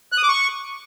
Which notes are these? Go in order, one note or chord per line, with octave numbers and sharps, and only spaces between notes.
F#6
D#6
D6
C#6